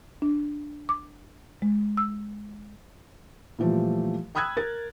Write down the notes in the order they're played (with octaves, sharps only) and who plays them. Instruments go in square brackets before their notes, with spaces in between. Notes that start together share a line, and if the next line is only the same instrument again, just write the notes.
[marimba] D4
D6
G#3
E6
[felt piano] A#2 E3 F3 G3 A3
G5 B5 D#6 E6 F#6 G#6
A#4 A6